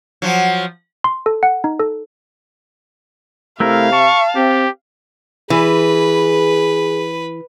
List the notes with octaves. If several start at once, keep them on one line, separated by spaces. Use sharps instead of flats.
F3 F#3
C6
A4
F#5
D#4
A4
C3 A3 E4 A#4 F5
A5 C#6
C4 G4
E3 G#4 B4